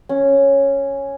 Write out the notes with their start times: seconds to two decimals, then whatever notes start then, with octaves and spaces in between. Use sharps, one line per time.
0.09 C#4